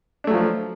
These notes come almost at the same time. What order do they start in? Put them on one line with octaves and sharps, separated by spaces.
D4 A3 F#3 F3